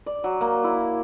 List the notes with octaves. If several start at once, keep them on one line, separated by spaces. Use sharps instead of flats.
D5
F#3
A#3
E4